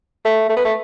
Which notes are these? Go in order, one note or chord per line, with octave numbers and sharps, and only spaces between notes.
A3
A3
B3
A3